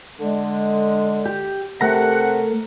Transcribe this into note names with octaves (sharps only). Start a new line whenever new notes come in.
D3 G#3
G4
C3 A3 A#4 F#5 A#5